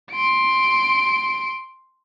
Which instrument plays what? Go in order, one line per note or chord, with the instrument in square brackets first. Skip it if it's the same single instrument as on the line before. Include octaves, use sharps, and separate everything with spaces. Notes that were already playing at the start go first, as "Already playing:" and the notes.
[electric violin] C6 D7